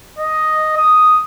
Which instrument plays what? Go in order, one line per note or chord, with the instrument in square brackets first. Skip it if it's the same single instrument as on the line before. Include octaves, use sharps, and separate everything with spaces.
[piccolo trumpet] D#5
D#6